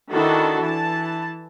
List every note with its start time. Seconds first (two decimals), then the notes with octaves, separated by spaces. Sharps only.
0.11 D#3 D4 E4 F#4 A4 A5
0.58 E3 A5